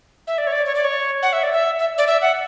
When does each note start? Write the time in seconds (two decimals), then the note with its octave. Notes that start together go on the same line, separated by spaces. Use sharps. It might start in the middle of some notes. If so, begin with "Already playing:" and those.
0.27 E5
0.38 D5
0.47 C#5
0.52 D5
0.66 C#5
0.75 D5
0.84 C#5
1.23 F#5
1.33 E5
1.43 D5
1.52 E5
1.79 E5
1.98 D5
2.07 E5
2.22 F#5